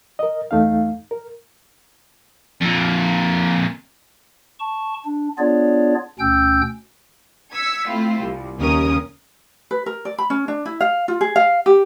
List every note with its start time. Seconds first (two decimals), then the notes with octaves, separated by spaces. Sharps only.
0.19 A#4 D#5
0.51 E2 A3 D#4 F5
1.11 A#4
2.61 F2 A#2
4.60 A5 C#6
5.05 D4
5.38 B3 D4 F4 G#4 C#5 D5
6.19 D2 B2 C#4 G5 E6 G6
7.53 E6 G#6 B6 C#7
7.88 A3 C4 E4 F4
8.21 C2
8.58 D#2 C#3 C#4 A#4 D#6
9.71 B4
9.86 A#4
10.05 D5
10.18 B5
10.30 C#4
10.48 D4
10.66 E4
10.81 F5
11.08 F4
11.21 G#4
11.36 F5
11.66 G4